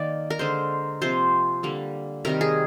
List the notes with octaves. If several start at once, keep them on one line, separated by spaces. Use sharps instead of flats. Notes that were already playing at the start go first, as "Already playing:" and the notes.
Already playing: D#3 A#3 D5
A#4
D3 G#3 C5
C3 F3 A#3 C5
D3 G3 A#3
C3 D#3 G3 A#4
G#4